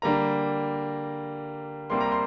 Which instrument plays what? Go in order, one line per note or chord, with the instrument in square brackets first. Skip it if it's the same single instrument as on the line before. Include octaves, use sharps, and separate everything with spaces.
[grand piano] D3 G3 A#3 A#5
C3 G3 A#3 C6
A#5
C6